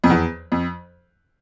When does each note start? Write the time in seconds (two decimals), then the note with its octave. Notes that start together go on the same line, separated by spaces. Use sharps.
0.04 F2
0.10 E2
0.52 F2